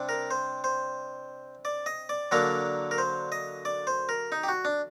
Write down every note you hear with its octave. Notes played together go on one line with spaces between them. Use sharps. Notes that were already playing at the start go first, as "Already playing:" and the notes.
Already playing: C3 G3 D4
A#4
C5
C5
D5
D#5
D5
D3 F#3 A#3 D4 A#4
A#4
C5
D#5
D5
C5
A#4
D#4
G4
F#4
D4